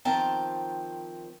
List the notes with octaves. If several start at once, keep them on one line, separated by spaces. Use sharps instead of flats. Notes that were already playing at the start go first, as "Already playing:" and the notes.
D#3 F3 C4 A#4 G5 A5